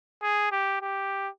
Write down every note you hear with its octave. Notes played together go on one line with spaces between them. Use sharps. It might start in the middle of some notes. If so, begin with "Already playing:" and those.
G#4
G4
G4